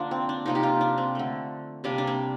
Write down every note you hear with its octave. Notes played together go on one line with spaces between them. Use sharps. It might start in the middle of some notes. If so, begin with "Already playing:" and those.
Already playing: D3 F3 A#3 D4 F4
C4
D4
C3 F3 A#3 D#4
G4
F4
D4
C4
D3 A3
C3 G3 A#3 D4
D4
C4